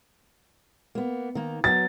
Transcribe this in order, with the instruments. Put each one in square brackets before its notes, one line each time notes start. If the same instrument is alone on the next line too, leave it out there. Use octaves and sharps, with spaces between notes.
[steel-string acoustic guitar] A#3 B3
D#3 A#3
[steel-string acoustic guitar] F#3 B3 [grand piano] A6